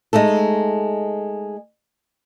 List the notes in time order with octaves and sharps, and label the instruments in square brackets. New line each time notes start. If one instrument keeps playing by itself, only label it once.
[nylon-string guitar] G#3 A3 D#4 A4